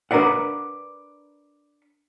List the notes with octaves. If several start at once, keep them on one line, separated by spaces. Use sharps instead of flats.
D4 A#4 B4 D5 F#5